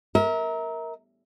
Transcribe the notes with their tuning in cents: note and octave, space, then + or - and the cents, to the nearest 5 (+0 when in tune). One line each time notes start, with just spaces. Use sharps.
A#4 +5 E5 -35